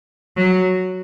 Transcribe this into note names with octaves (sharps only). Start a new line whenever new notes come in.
F#3